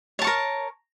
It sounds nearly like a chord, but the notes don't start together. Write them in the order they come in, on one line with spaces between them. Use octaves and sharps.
C#5 A5 C#6 A#4